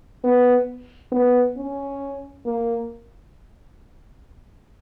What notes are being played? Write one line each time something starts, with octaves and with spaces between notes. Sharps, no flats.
B3
B3
C#4
A#3